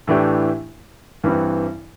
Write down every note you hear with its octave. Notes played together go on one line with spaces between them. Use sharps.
A2 E3 A3 D4 G4
G2 E3 G3 C4